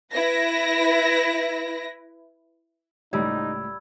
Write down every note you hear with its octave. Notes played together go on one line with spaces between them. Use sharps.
E4 B4 A#6
C#2 A2 G3 D#4 B5 E6 G#6